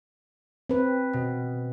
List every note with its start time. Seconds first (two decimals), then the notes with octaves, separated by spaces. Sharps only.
0.69 C4 B4
1.13 B2